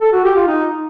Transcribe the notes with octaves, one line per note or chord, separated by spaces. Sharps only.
A4
F#4
G4
F4
D#4